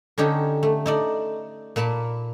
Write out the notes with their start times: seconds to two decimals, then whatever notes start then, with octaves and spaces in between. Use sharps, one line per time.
0.18 D3 C#4 D#4 G4 A4
0.63 A3
0.86 D#4 A4 D5
1.76 A#2 A#3 A5 B5